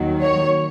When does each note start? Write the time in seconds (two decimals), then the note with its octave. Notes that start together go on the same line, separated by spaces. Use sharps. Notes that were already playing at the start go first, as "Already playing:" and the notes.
Already playing: D#2 D#3 F#3
0.22 C#5